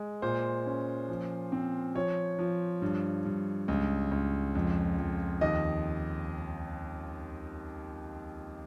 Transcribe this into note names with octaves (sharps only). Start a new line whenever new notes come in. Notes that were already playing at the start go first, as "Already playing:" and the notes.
Already playing: G#3
A#2 C5
C#4
F3
C4
F3 C#5
F3
G2
G2
C#2
C#2
F2
F2
D#2 D#5